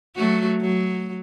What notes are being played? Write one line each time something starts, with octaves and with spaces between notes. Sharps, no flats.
F#3 A3 F#4
F#3